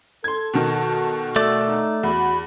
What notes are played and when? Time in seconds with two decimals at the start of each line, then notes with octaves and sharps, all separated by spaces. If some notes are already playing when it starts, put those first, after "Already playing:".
0.24 A4 C6 G#6
0.54 B2 D#3 A5
1.36 A3 D5 E6
1.68 D#4
2.03 E2 F#4 B5